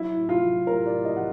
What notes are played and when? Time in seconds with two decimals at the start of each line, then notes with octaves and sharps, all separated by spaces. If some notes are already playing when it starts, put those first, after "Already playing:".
Already playing: F#3 E4
0.16 A2
0.29 F4
0.42 F#3
0.67 A2 A#4
0.86 D5
0.92 A2
1.05 D#5
1.16 F#3 F#5